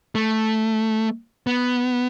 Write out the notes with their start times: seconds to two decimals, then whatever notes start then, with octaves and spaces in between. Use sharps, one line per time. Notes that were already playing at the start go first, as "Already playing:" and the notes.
0.15 A3
1.47 B3